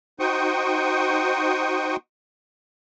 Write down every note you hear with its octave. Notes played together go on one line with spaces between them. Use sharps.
D#4 F#4 C5 G5 C#6 D#6